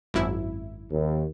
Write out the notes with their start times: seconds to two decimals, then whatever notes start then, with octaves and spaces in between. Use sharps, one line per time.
0.14 G#1 F#2 E4
0.91 D#2